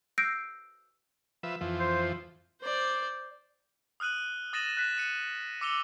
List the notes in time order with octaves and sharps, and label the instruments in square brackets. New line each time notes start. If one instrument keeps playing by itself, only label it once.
[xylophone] E6 F#6 G6 A#6 C7 D7
[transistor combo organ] F3 B4 E5
F2 E3 F3
[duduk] C5
[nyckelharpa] C5 D5
[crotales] D#6 F6 F#6 D#7 F#7
D#6 A6 A#6 D#7 E7 F#7
F#6 B6 E7
C#7 D#7
D6 E6 C#7 F7 G7